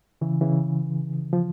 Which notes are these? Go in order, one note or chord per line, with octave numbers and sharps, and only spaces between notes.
C#3 E3
C#3 E3
F3